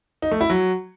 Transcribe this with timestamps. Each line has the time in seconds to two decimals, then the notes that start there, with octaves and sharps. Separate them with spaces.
0.22 D#4
0.31 A3
0.41 E4
0.50 F#3